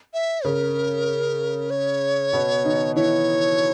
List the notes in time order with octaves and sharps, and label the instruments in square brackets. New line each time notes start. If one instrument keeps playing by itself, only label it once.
[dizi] E5
[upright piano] C#3 [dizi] A#4
[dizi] C#5
[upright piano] B2 B3
D#3 D#4
[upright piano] E3 E4 [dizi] C#5